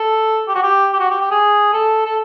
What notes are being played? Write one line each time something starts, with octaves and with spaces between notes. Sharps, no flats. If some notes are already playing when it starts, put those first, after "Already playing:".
Already playing: A4
G4
F#4
G4
G4
F#4
G4
G4
G#4
A4
A4